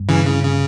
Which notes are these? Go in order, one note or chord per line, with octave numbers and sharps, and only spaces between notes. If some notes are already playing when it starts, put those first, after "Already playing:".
Already playing: G2 G3
C#3 E3
C#3
C#3